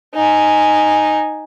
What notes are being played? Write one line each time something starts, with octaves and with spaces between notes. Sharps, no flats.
D#4 G#5